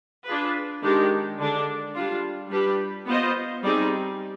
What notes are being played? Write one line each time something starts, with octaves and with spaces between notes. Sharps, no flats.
D4 F4 G#4 B4
D#3 G#3 D4 G4
D3 G#3 D4
G3 D4 F4
G3 D4 G4 B4
B3 F4 C5 D#5
G3 C4 D#4 G#4 D5